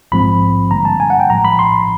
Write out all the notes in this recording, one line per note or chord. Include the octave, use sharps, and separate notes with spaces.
A#1 G#2 F3 G#3 C4 B5
G2 D3 G3 A#3 A#5
A5
G#5
F#5
G5
A#1 A2 F3 G#3 A#5
B5
C6